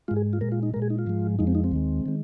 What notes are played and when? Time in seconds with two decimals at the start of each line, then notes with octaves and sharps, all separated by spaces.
0.08 G#2 G#3 F4
0.16 G#4
0.33 F4
0.41 A#2 G#3 A#4
0.52 F4
0.63 D#4
0.74 G#3 A#4
0.76 A#2
0.82 G#4
0.90 D#4
0.99 F4
1.06 G#2 F3 G#3
1.39 F2 F3 G#3 D#4
1.47 C4
1.55 D#4
1.64 C4
1.71 D#2 D#3 G#3
2.06 D#3 G#3